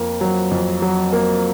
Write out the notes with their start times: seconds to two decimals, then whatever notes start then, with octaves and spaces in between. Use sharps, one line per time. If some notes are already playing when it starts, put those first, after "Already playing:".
Already playing: F2 A#3
0.21 F#3
0.51 F2
0.82 F#3
1.12 A#3